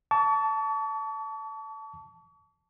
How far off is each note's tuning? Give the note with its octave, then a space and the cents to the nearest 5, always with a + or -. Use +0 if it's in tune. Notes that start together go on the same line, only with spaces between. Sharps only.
A5 +0 C#6 +45